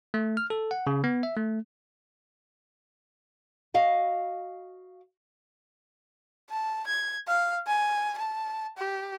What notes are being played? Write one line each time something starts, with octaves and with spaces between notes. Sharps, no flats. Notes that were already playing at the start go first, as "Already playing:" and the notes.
A3
F6
A4
F#5
C#3
B3
E5
A3
F#4 D#5 F5
A5
G#6
F5
G#5
A5
G4